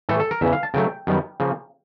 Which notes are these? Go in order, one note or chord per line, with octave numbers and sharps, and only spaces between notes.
A2 E3 A3 A4
A4
A#4
E2 C#3 E3 E5
F5
A5
C#3 F#3 A3 G5
F#2 D#3 G3 B3
C#3 F3 A#3